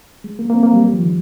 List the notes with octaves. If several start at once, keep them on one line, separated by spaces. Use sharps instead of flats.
G#3
A#3
A#3
C4
A#3
G3
G3
F3
D#3